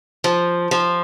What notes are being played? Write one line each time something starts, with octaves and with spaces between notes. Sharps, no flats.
F3
F3